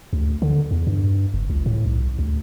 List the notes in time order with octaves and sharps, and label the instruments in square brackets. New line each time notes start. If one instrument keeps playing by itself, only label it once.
[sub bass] D2
D3
E2
G2
F#1
C#2
A2
C2
D2